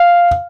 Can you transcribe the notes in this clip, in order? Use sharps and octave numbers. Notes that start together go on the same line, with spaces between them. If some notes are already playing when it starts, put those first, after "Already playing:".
Already playing: F5